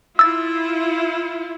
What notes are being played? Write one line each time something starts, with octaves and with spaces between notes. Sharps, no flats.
E4 F4 E6 A6